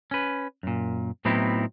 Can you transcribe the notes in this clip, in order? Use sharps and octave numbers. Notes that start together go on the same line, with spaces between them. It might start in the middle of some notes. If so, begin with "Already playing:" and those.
C#4 B4
F#2 A#2
A2 F#3 B3 C4 D#4 E4